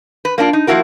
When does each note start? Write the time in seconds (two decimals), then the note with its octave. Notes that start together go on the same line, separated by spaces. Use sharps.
0.25 B4
0.38 A#3 C4 D4 F4
0.53 D#4
0.67 F3 A#3 B3 E4 F#4 A#4